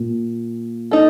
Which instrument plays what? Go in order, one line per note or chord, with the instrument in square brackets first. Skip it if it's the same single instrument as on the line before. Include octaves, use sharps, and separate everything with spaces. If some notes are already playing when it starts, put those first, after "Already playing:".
Already playing: [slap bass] A#2
[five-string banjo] D#4 A4